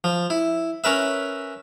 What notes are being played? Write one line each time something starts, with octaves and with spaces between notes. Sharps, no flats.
F3
E4
C#4 A#4 B4 E5